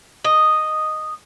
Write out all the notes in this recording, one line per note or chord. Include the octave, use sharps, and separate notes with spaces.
D#5